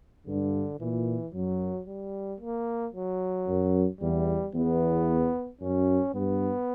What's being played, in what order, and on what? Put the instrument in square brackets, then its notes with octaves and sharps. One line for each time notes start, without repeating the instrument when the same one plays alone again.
[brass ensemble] G2 [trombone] D3
[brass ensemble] A#2 [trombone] E3
[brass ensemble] F#2 [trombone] F#3
[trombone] G3
A#3
F#3
[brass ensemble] F#2
[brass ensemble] E2 [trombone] G3
[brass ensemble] E2 [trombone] B3
[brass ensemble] F#2 [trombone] C#4
[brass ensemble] G2 [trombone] B3